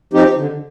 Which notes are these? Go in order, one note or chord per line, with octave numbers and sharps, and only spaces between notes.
F3 C4 D#4 G4
D3